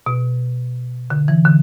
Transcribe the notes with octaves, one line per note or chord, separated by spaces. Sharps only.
B2
D3
E3
D3